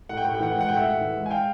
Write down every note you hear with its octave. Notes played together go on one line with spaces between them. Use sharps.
A2 F#5
G5
A2 F#5
G5
E3 F#5
G#3 G5
F#5
A2 G5
E5 F#5
A2
E3
G#3
G#5
F5 G5